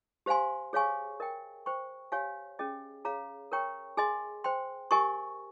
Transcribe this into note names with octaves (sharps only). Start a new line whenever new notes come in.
G4 C5 F5 G#5 C6
G#4 C#5 F5 G#5 C#6
A#4 D#5 G5
C5 G5 C#6
G4 C#5 F5 G#5
C#4 G#4 D#5 G5
G#4 C#5 F5 A#5
A#4 C#5 G5 A#5 C#6
G#4 D#5 G#5 C6
C5 G5 C6
G4 A#4 D#5 G#5 C#6